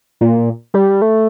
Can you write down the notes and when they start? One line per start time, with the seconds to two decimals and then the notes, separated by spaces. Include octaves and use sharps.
0.21 A#2
0.74 G3
1.02 A3